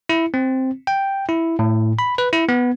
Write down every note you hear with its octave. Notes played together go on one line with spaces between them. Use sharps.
E4
C4
G5
E4
A2
B5
B4
E4
B3